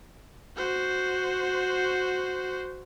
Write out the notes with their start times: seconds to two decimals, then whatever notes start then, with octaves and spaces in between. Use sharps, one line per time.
0.56 F#4 C5